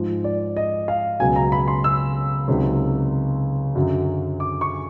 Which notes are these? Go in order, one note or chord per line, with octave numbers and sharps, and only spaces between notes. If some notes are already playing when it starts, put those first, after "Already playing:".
Already playing: G#2 F3
D5
D#5
F5
C#2 B2 F#3 G#5
A#5
B5
C6
E6
C#2 C3 D#3 F#3
F#2 D3 F#3
D6
C#6